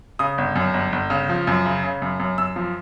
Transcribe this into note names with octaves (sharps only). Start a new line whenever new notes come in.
C#3 D#6
G1
F#2
G1
G1
C#3
F3
F#2
C#3
C#3
F#2
F#2
F#2 E6
F3